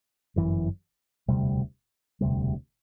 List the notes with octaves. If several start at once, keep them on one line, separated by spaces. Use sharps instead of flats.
G1 F#2 E3
E1 D2 C3 G3
E1 D2 C3 G3